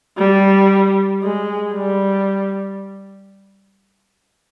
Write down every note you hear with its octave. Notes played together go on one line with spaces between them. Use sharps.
G3
G#3
G3